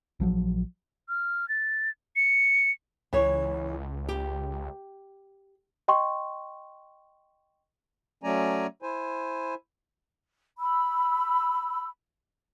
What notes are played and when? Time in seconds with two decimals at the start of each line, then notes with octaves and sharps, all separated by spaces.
0.20 A#1 F3 F#3
1.09 F6
1.49 A6
2.16 C#7
3.13 C#2 E3 C#5
4.08 G4
5.88 D#5 G5 C6 C#6
8.23 F#3 A3 C#4 D5 G#5 A#5
8.82 E4 C5 G#5
10.59 B5 E6